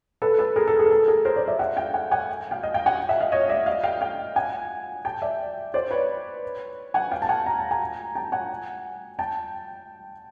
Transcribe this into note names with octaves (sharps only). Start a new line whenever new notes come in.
A4 B4
A4 B4
G#4 A#4
A4
G#4
A#4
A4
G#4 A#4
A#4 C5
C5 D5
D5 E5
E5 F#5
F5 G5
F#5 G#5
F#5 G#5
F5 G5
D#5 F5
F5 G5
F#5 G#5
E5 F#5
D#5 F5
C#5 D#5
D5 E5
D#5 F5
F5 G5
F5 G5
F#5 G#5
G5 A5
D5 E5
C5 D5
B4 C#5
F#5 G#5
F5 G5
A5
F#5 G#5
A#5
A5
G#5 A#5
G5 A5
F#5 G#5
G5 A5